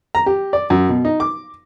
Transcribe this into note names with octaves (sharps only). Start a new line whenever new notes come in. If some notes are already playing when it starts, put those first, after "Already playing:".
A#5
G4
D5
F#2
B2
D#4
D6